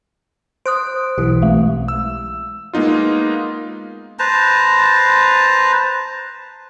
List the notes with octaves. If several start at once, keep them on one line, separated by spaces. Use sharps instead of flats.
C5 D#6 F#6 D7
B1 E3 G4
G#3 A3
E6
G#3 A#3 B3 D#4 F4
B4 C5 A5 A#5